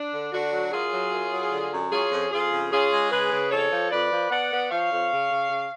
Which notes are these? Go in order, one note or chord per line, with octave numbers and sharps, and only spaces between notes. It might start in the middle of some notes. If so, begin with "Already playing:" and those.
Already playing: D4
D3
D3 D4 F#4
F#3
F#2 F4 G#4
F#3
F#2
F#3
D3
F#2
C#4 F4 G#4
F2
F2 F4 G#4
C#3
C#4 F4 G#4
G#3
C#3 G#4 B4
C#3
F2 A4 C#5
F3
F2 B4 D5
F3
B3 D5 F#5
B3
F3 C#5 F5
F2
C#3
C#3
C#3